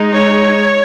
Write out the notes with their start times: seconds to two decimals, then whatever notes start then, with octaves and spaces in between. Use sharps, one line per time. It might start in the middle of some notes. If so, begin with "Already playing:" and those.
Already playing: G#3 D#4
0.13 C#5